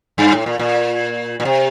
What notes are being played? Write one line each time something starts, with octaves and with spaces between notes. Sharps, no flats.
G2
A2
A#2
A#2
A#2
C3